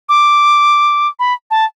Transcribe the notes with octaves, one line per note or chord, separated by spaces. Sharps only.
D6
B5
A5